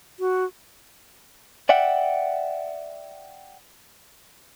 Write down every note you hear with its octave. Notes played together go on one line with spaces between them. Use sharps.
F#4
D5 E5 F#5 G5